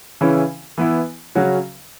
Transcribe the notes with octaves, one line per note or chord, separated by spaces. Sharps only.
C#3 E3 C#4 E4
E3 B3 E4
C#3 F#3 C#4 F#4